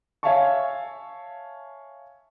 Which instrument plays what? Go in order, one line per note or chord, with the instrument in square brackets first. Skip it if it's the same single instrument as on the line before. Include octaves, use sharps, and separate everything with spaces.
[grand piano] C#5 E5 F5 G#5 A5 C#6